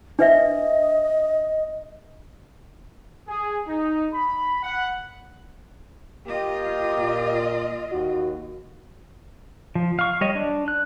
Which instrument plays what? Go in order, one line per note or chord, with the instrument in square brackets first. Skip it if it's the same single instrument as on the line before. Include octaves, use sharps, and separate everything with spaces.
[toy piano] D4 B4 E5 [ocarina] D#5
[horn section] G#4
D#4
B5
F#5
[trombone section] A#3 G4 [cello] F4 D#5
[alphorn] A#2
[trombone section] D#2 [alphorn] F#4
[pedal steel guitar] F3
F5 C#6
G3 C#5 D#5
D4
F#6